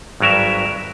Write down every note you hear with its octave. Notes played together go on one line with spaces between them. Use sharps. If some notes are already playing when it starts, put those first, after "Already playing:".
G#1 G2 F#3 A#4 E5